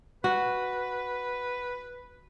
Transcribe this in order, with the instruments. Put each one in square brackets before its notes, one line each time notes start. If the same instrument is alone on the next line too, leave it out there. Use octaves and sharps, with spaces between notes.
[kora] F#4 [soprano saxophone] B4